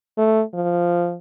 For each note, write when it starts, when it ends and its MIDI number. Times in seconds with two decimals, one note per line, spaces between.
0.18 0.42 57
0.54 1.16 53